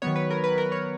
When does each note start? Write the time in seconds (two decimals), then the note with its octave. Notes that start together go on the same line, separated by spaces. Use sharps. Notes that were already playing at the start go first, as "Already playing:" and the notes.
0.02 D#3 F#3 B3 C#5
0.16 B4
0.30 A#4
0.44 B4
0.58 A#4
0.72 C#5